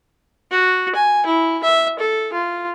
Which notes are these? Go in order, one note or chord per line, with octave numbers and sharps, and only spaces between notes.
F#4
G#5
E4
E5
A4
F4